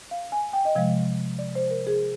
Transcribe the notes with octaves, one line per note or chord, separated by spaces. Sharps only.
F5
G#5
G5
D#5
C3 F3 G#3 F5
D5
C5
A#4
G#4